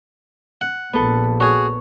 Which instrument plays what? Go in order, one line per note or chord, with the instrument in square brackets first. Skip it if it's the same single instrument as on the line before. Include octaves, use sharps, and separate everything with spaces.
[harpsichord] F#5
[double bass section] A#1 [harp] B3 A4
[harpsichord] F#4 G#4 [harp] C#5